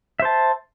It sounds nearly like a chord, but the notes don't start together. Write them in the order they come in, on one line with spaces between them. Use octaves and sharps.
E5 C5 A5